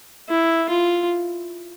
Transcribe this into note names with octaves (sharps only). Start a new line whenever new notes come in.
E4
F4